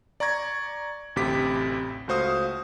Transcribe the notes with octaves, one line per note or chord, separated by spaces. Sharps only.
D5 A#5 C#6 G#6 A#6
A1 D2 C3 G4 D6 B6
C#2 A3 F#4 C5 F5 D#6